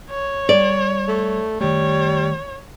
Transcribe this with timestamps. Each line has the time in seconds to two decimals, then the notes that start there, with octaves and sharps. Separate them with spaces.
0.10 C#5
0.49 G3 D5
1.08 A3
1.61 D#3 G3 A3 C#5